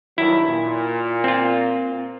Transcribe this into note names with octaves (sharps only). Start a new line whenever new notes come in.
G2 D#3 F#3 E4
A#2
C4 F4